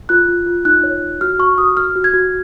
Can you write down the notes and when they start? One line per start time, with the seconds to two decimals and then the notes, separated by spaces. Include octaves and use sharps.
0.09 F4 F#6
0.28 F4
0.46 F4
0.65 D#4 F#6
0.83 C#5
1.02 C#5
1.21 F#4 F6
1.39 F#4 C#6
1.58 F#4 D#6
1.77 F#4 F6
1.96 F#4
2.04 G#6
2.14 F#4